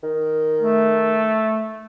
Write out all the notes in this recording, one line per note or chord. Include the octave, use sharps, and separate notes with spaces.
D#3
A3